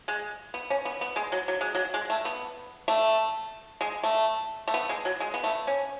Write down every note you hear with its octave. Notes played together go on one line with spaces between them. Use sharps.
G#3
B3
C#4
B3
B3
G#3
F#3
F#3
G#3
F#3
G#3
A3
B3
A3
G#3
A3
A3
B3
G#3
F#3
G#3
B3
A3
C#4